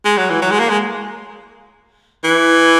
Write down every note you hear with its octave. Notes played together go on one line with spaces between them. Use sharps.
G#3
F#3
E3
F#3
G#3
A#3
G#3
E3